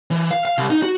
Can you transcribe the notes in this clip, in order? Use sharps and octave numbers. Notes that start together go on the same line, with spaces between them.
E3
F5
F5
C2
D#4
F#4